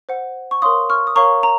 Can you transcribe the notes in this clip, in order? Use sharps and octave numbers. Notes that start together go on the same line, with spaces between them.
C5 F#5
C#6
A#4 C#5 F5 C6 D#6
C#6 F6
D#6
A#4 C#5 F5 A#5 C#6
A#5